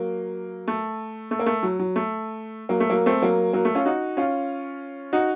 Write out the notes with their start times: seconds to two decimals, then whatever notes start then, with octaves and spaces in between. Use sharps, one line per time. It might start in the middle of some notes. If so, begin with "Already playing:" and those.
Already playing: F#3 A#3
0.68 A3
1.31 A3
1.39 A#3
1.46 A3
1.63 F#3
1.79 F#3
1.96 A3
2.69 F#3 A#3
2.80 A3
2.90 F#3 A#3
3.06 A3 C4
3.22 F#3 A#3
3.53 F#3 A#3
3.65 A3
3.75 C#4 F4
3.86 D#4 F#4
4.17 C#4 F4
5.13 D#4 F#4